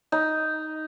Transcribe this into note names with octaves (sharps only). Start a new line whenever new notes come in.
D#4